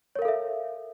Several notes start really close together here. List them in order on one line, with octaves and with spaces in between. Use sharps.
C#5 A#4 F5 A4 E5